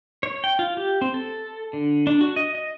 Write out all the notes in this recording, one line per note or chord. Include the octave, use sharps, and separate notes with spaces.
C#5
G5
F4
G4
C4
A4
D3
D4
F#4
D#5
D#5